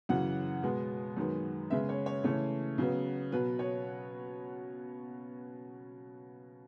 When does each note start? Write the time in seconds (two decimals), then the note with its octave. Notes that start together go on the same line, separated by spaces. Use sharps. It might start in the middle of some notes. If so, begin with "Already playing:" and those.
0.09 F#2 C#3 E3 F#5
0.63 B2 G#3 B3
1.17 F#2 D#3 G#3 B3
1.70 C#3 G#3 B3 E5
1.89 C#5
2.06 C#5
2.24 C#3 E3 A3 C#5
2.78 C#3 F#3 B3
3.32 B2 F#3 B3 B4
3.59 C#5